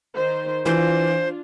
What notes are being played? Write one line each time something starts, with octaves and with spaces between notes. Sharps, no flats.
D#3 C5
E3 D4 F4 C5